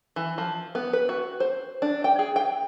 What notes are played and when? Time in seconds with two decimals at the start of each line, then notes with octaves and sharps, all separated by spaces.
0.16 E3
0.38 F3
0.75 B3
0.93 B4
1.09 F#4
1.40 C5
1.82 D4
2.04 G5
2.19 G#4
2.36 G5